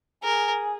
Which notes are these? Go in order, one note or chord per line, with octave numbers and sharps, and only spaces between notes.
G#4 A#4